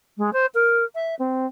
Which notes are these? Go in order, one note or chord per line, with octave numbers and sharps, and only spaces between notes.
G#3
C5
A#4
E5
C4